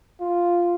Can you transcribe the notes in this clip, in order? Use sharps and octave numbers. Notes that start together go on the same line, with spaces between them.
F4